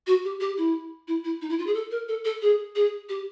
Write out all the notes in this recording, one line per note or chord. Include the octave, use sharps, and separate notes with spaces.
F#4
G4
G4
E4
E4
E4
D#4
E4
F4
G#4
A4
A#4
A4
A4
G#4
G#4
G4